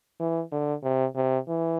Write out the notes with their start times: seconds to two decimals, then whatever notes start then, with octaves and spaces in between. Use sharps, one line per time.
0.20 E3
0.52 D3
0.83 C3
1.16 C3
1.48 E3